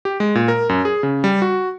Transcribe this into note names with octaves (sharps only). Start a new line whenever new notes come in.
G4
G#3
A#2
A#4
F#2
G#4
C#3
G3
F#4